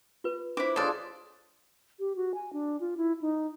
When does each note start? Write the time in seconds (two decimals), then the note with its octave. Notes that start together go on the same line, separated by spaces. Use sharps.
0.24 F4 B4
0.57 D4 E4 C5 D6
0.76 D4 F4 G#4 A4 C#5 D5
1.99 G4
2.16 F#4
2.34 G#5
2.53 D4
2.80 F4
2.97 E4
3.22 D#4